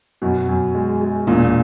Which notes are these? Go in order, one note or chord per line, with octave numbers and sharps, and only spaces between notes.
F#2 B2
F#2
G#3
G#3
E1 A#2